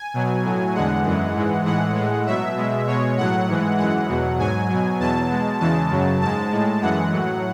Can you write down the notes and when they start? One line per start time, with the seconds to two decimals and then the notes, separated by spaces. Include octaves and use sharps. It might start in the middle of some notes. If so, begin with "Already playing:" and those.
Already playing: G#5
0.14 B2 F#3
0.44 A2 F#3
0.75 E2 D3 G#3 F#5
1.05 F#2 E3 G#3
1.35 G#2 E3 G#3
1.65 A2 E3 G#3 F#5
1.95 A2 G#3
2.26 B2 F#3 E5
2.57 B2 G#3
2.87 B2 G#3 C#5
3.17 A2 F#3 F#5
3.47 G#2 E3 G#3
3.78 F#2 E3 G#3 F#5
4.09 E2 B2 F#3
4.39 G#2 F#3 G#5
4.69 B2 F#3
4.99 E2 B2 F#3 A5
5.30 B2 G#3
5.61 E2 C#3 E3 G#3 A5
5.91 F#2 C#3 F#3
6.22 G#2 G#3 A5
6.52 A2 G#3
6.82 F#2 E3 G#3 F#5
7.12 A2 F#3